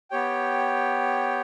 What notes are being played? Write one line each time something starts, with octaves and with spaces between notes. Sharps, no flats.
B3 G4 C#5 G5